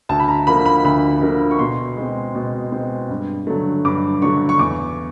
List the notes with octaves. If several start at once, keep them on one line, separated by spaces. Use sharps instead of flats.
D2 A5
B5
A#5
D3 F3 A#3 B5
B5
D2 B5
D3 F3 A#3
C#6
B2 C6
G#3 C4
B2
G#3 C4
G2
D3 F#3 A3
G2 D6
D3 F#3 A3 C#6
C#6
E2 D6